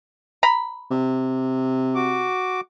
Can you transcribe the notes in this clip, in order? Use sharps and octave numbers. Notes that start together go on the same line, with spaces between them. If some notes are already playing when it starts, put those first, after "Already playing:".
A#5 B5
C3
F#4 D6